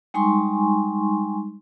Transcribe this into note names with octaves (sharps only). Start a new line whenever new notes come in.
G3 G#3 D#4 G#5 C6 C#6